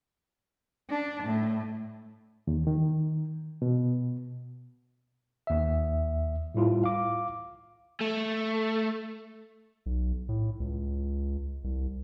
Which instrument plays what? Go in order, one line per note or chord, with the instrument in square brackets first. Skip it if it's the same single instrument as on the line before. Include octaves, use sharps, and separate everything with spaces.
[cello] D4
A2
[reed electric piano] D#2
D#3
B2
[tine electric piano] D#2 E5
A2 G3 E4 F4
F5 D6
[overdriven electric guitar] A3
[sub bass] B1
A2
C#2
C2